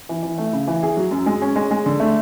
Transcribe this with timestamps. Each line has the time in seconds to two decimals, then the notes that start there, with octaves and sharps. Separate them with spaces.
0.09 E3
0.23 E3
0.38 A3
0.53 C#3
0.67 E3
0.83 G#4
0.97 F#3
1.11 F#2
1.26 G#3
1.42 C#4
1.56 G#3
1.71 G#3
1.86 D3
2.00 A3